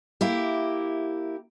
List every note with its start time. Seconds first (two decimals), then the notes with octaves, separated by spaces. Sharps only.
0.21 A#3 E4 G4